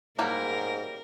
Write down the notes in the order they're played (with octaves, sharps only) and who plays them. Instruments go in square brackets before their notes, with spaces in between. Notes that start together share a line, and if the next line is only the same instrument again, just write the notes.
[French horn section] G#2 [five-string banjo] F#3 G3 A#3 [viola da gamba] A#4